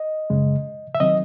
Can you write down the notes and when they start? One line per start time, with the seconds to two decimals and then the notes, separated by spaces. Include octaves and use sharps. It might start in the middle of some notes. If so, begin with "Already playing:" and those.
Already playing: D#5
0.30 F#2 C#3 G#3
0.95 E5
1.00 D#3 F#3 C4 D#5